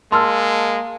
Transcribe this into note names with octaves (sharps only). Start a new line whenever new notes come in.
G#3 A#3 A5 C6 E6 F6